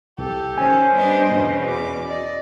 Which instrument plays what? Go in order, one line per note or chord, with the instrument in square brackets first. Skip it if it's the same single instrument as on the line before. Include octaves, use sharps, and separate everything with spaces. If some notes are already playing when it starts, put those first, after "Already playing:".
[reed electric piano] C2 [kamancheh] G4 A4
[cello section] D#3 C#4 [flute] C5 [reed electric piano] G#5
[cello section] G3 B3 D4 [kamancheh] D#5
[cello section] E2 B2 C#4
[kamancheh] D6
[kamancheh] D5 [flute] D#5